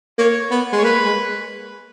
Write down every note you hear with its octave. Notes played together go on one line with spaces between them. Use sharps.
A#3 C#5
B3
G#3
C#5
A#3 B4
G#3